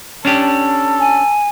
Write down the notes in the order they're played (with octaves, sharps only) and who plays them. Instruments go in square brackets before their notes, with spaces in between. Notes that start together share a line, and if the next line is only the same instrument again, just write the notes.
[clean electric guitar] C#4 D4 G4 [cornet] A4
[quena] G#5